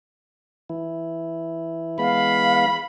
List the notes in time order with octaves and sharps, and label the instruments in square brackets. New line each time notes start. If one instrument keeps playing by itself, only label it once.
[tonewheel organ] E3 E4
[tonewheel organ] E3 G#3 B3 [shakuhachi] F5 [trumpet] B5